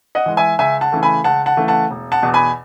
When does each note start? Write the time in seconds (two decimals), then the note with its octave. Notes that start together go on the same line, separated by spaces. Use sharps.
0.15 D#5 F#5
0.26 E3 G#3
0.37 E5 G#5
0.59 C#2 E5 G#5
0.81 F#5 A5
0.92 C#3 E3 A3
1.03 G#5 B5
1.24 C#2 F#5 A5
1.46 F#5 A5
1.57 C#3 E3 A3
1.68 F#5 A5
1.90 E1
2.12 F#5 A5
2.23 E2 B2
2.34 G#5 B5